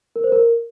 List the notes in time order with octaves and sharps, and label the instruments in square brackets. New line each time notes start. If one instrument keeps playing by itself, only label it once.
[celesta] A#4
C5
A#4